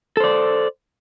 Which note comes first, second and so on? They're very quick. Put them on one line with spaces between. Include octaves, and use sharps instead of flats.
A4 C5 D5